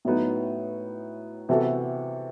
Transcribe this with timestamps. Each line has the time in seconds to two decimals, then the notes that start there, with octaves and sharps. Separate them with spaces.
0.05 A2 F#3 B3 D#4
1.49 C3 E3 B3 F#4 A4